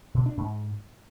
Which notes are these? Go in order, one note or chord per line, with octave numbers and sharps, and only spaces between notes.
B2
D4
G#2